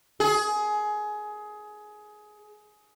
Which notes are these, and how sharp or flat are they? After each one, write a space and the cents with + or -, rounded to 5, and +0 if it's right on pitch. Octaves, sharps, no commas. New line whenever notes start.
G#4 +20